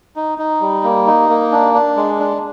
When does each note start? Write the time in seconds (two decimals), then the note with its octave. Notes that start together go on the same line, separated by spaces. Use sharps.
0.16 D#4
0.38 D#4
0.61 G3
0.84 A#3
1.06 D#4
1.29 A#3
1.52 D4
1.74 D4
1.96 G#3
2.19 D4